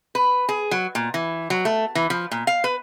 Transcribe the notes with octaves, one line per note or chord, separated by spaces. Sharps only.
B4
G#4
F#3
A#2
E3
F#3
A3
E3
F3
A#2
F5
B4